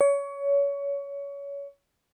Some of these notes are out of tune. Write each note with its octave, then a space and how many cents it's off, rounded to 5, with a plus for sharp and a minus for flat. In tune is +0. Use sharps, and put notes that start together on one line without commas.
C#5 +25